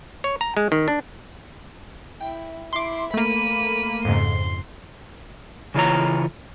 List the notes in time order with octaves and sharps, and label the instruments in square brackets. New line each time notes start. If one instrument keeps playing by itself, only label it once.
[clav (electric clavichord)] C#5
A#5
G#3
D#3
D4
[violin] E4 [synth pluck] G5
[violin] E4 [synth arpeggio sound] C6 D6
[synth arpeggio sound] A3 A#3 [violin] B5 D#7
[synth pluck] F2 G#2 C#3 [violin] C6
[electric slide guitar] C#3 E3 F4 C#5 A#5